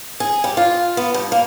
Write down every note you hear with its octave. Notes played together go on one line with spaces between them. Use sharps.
G#4
G3
F4
B3
G2
A#3